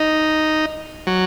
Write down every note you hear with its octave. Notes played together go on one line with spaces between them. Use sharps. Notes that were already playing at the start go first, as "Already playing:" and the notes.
Already playing: D#4
F#3